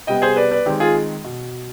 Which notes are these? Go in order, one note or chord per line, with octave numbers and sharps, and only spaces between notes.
C3 G3 B3 D#5 G5
G#4 C5
B4 D5
B4 D5
D#3 G#3 C4 G4
F4 G#4
B2